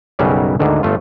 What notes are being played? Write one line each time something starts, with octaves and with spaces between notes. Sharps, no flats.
B1 F#2 C#3 F#3 G3 G4
D2 G#2 D3 D#3
G1 A3 F4